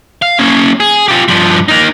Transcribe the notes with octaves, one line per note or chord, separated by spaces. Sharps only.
F5
A#3 C#4
G#4
F4 G4
G2 F3
A#3 D#4